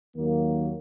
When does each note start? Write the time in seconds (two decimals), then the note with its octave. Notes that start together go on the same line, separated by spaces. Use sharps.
0.15 D#2 D#3 F#3 A#3